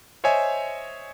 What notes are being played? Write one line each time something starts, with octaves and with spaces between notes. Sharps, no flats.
C5 C#5 D#5 E5 G#5